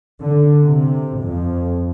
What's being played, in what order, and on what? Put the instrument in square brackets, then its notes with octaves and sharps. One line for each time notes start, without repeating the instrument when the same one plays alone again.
[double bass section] D3
C3
F2